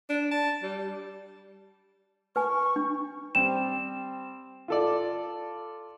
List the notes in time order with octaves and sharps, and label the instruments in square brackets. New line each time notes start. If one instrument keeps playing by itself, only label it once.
[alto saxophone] D4
A5
G3
[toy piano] B4 G#5 [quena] C#6
[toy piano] D4
[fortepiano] G3 C4 [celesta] E7
[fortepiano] F4 A4 D5